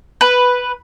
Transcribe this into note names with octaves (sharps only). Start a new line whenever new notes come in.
B4